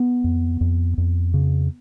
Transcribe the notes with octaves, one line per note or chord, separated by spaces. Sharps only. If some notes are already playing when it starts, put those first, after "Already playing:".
Already playing: B3
F2
F2
F2
C#3